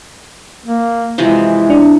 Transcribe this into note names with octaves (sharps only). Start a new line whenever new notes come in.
A#3
C3 E3 F3 G#3
D4